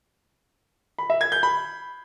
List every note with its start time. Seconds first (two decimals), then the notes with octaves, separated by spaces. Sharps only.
0.99 B5
1.10 E5
1.21 G#6
1.32 G6
1.43 B5